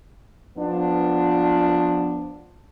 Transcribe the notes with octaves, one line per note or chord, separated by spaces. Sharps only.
F3 B3 D4